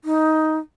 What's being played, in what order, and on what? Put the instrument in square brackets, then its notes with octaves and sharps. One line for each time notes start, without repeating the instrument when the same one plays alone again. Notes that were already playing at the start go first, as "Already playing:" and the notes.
[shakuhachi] D#4